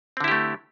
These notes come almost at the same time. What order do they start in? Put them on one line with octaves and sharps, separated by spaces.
C4 D3 E4 G4 A3